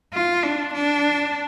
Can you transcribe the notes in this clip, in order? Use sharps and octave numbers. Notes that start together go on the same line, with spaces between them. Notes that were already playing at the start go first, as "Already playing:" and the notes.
F4
D4
D4